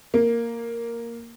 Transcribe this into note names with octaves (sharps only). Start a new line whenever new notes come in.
A#3